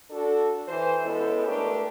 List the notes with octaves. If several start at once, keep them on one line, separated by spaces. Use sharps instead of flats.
D4 F#4 A4
E3 C5
G#3 B3 C#4 E4 A4
A3 D4 G4 A#4 B4